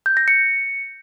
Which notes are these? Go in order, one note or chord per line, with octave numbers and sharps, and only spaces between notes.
G6
A#6
C#7